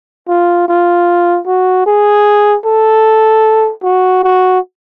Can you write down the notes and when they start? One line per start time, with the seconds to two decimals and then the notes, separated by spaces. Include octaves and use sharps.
0.28 F4
0.68 F4
1.47 F#4
1.86 G#4
2.65 A4
3.83 F#4
4.24 F#4